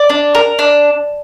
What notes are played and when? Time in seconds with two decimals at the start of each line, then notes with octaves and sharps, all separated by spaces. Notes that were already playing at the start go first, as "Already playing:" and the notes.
Already playing: D5
0.09 D4
0.35 A#4
0.59 D4